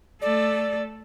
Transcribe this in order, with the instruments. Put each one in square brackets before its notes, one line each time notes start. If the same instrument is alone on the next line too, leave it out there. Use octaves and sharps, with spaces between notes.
[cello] A3 A4 [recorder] D5